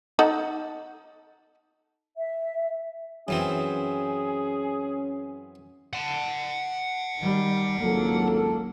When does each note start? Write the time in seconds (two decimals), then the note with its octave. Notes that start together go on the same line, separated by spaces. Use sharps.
0.19 D#4 A4 F#5
2.18 E5
3.28 F#2 E3 C4 C#4 G#4
5.93 F#5 A5
7.18 D#3 G3
7.80 G#1 C#2 F#3 A#3 A4